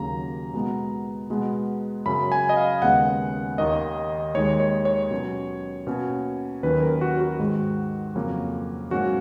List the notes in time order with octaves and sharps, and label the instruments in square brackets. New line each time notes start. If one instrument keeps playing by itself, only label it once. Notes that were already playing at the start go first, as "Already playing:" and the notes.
Already playing: [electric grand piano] D#2 C#3 F#3 A#3 A#5
B2 G#3 B3
B2 G#3 B3
F#2 C#3 F#3 B5
G#5
D#5
F5
D#2 C#3 G#3 B3 F#5
D#2 D#3 A#3 D#5
D#2 D#3 G#3 C#5
C#5
C#5
B2 F#3 C#4
B2 A#3 C#4
D#2 D#3 F#3 C#4 B4
A#4
F#4
F#4
G#2 D#3 G#3
F2 C#3 F#3 A#3 C#4
G#2 F#3 A#3 C#4 F#4